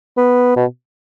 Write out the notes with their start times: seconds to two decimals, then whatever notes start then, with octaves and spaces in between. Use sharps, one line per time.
0.17 B3
0.56 B2